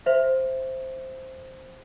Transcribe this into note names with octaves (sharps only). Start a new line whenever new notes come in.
C5 E5